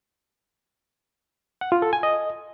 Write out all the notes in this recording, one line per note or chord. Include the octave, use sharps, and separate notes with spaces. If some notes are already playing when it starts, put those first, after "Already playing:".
F#5
F4
A4
G#5
D#5